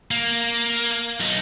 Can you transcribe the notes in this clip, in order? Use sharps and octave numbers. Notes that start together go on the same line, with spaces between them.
A#3
B1 D#4